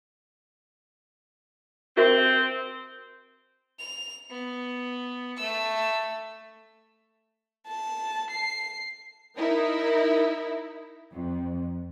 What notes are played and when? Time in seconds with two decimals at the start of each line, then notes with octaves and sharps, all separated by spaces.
1.97 C4 F#4 A#4 E5
3.79 F7
4.30 B3
5.37 A3 E6
7.68 A5
8.31 C7
9.37 D#4 E4 A#4
11.13 F2